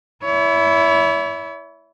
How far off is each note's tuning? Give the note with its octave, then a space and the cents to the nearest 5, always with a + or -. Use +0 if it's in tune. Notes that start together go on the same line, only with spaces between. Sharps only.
E4 +0 C#5 +40